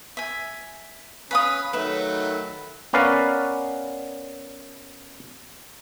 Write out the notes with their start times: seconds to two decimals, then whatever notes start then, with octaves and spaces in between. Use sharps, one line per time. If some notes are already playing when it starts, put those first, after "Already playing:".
0.17 E5 G#5
1.31 C#4 B4 F5 D#6
1.73 D#3 F#3 A3 B4 E5
2.93 B3 C#4 A#4 B4 D5 F5